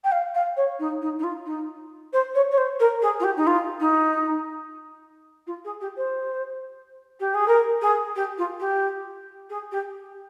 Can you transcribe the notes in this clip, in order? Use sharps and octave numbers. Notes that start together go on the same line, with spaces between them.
G5
F5
F5
C#5
D#4
D#4
D#4
F4
D#4
C5
C#5
C#5
C5
A#4
G#4
F4
G4
D#4
F4
D#4
F4
G#4
G4
C5
G4
G#4
A#4
G#4
G4
F4
G4
G#4
G4